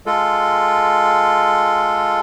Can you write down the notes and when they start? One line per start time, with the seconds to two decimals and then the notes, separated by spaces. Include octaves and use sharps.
0.06 G#3 F4 A4